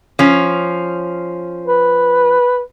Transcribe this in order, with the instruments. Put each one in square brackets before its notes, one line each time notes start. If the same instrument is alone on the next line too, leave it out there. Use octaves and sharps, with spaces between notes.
[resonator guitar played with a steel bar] F3 C#4
[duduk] B4